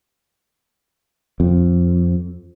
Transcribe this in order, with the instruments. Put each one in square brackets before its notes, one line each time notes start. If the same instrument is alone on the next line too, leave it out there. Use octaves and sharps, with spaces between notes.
[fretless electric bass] F2